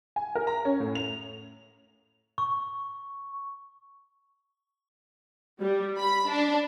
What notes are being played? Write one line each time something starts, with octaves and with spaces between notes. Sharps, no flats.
G#5
A#4
A#5
C#4
A2
F7
C#6
G3
B5
D4